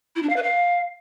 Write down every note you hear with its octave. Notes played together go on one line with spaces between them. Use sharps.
E4
D4
F5
B4
F5